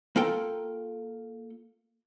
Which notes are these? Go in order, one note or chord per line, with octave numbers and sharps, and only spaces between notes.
A#3 F4 A4 G5